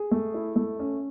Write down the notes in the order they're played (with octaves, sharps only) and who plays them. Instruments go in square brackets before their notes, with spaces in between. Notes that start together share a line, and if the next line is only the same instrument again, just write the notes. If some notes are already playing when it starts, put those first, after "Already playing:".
Already playing: [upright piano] G#4
A3
E4
A3
C#4